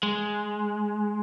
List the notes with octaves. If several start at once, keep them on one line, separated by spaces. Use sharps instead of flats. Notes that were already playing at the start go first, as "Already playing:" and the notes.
G#3